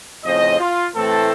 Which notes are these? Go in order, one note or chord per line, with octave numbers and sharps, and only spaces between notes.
F2 A2 C#3 C5 D#5
F4
A2 E3 A3 C4 A4